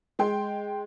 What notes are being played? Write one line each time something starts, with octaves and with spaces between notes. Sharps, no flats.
G#3 G5 C6